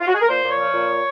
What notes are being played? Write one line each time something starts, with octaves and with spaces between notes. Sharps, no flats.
F4
F#4
G#4
A#4
A#2 C5
A#2
C#5
F3
A#2